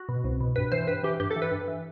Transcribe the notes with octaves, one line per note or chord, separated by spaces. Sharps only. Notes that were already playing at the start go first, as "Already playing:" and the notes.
Already playing: F#4
B2
C2
B2
G2 B4
E3 C5
G2 B4
E3 G4
G2 G4
A4
E3
B4
G2
E3